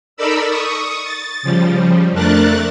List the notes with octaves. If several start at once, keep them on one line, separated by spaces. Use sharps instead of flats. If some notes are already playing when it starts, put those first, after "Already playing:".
D#4 A4 A#4 D5 B5 E6
C#6 D#6
A6
C#3 F3 G3
F2 A3 D4 A#4 F#6 A6